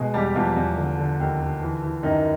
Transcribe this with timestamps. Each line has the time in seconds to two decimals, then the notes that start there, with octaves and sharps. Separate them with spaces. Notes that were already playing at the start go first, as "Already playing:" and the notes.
Already playing: B2 G#3 G#4
0.14 E2 G3 G4
0.35 E2 F3 F4
0.56 E2
0.77 D3
0.98 D3
1.20 D#2
1.40 D3
1.61 E3
1.83 E3
2.03 F#2 D#3 D#4